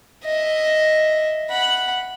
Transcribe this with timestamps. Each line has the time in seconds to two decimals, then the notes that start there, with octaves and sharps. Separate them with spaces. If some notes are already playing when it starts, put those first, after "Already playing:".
0.25 D#5 E5
1.50 F#5 B5